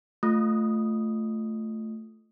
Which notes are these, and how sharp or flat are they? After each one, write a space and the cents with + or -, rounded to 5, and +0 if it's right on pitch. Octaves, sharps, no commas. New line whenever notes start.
A3 +0 F4 +0 D#6 +0